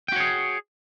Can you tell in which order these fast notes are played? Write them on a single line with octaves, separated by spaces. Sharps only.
G5 F#4 C#5 G#4